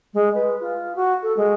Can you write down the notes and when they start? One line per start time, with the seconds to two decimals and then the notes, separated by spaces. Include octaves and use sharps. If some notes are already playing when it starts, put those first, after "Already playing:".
0.14 G#3
0.34 B4
0.61 F4
0.96 F#4
1.23 A4
1.37 G#3